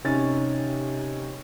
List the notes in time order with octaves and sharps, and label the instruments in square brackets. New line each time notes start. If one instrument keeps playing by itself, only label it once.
[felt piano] C3 C#4 D#4 A6